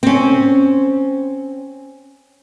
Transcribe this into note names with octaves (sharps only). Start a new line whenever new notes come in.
C4 C#4